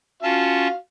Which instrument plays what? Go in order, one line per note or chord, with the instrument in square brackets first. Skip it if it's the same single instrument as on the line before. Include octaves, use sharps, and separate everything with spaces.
[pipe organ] C#4 F4 A5 [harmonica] F#4 F5